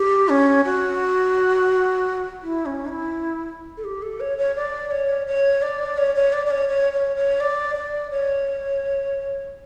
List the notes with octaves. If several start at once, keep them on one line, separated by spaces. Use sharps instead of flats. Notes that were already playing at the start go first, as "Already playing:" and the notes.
Already playing: G4
C#4
F#4
E4
C#4
E4
A4
G4
A4
C#5
C#5
D5
C#5
C#5
D5
C#5
C#5
D5
D5
C#5
C#5
C#5
C#5
D5
D5
C#5